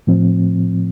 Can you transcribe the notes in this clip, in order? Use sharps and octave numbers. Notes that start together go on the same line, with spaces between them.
A2 F3 C4